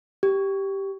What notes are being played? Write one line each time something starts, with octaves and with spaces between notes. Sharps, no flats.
G4